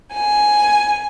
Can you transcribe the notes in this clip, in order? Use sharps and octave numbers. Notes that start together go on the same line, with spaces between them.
G#5